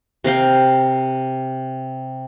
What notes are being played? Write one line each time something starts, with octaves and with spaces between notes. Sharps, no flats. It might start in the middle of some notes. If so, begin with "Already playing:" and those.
C3 A#4 F5 G5